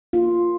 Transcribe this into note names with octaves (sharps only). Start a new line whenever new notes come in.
A#3 F4